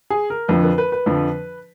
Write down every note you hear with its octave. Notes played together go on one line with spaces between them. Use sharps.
G#4
A#4
F2 D3 F3 B4
B4
B4
B4
F2 D3 F3